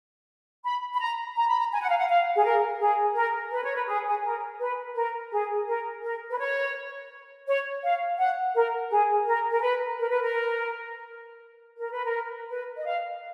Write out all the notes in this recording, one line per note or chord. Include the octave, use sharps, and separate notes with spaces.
B5
B5
A#5
A#5
B5
A#5
G#5
F#5
F5
F#5
F5
G#4
A#4
G#4
A#4
B4
C#5
B4
G#4
G#4
A#4
B4
A#4
G#4
A#4
A#4
B4
C#5
C#5
F5
F#5
A#4
G#4
A#4
A#4
B4
A#4
B4
A#4
A#4
B4
A#4
B4
D#5
F5